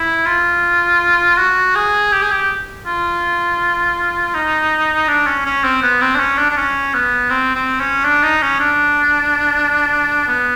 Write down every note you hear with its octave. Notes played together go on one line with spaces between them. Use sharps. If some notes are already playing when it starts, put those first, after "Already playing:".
Already playing: E4
F4
F#4
G#4
G4
G#4
G4
F4
D#4
D4
C#4
C#4
C4
B3
C4
D4
C#4
D4
D4
C#4
B3
C4
C4
C#4
D4
D#4
C#4
D4
B3